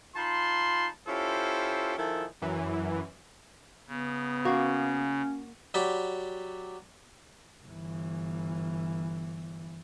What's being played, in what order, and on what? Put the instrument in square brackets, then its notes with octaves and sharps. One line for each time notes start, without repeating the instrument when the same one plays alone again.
[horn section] D#4 F4 A5 B5 C6
C#4 E4 F4 G4 A4 C5
D#3 F3 E4 G#4 A4
[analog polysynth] F#2 E3
[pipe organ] C#3 [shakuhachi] B3
[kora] A#3 F#4 [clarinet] C#4
[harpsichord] F#3 G4 D5 B5
[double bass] G1 E3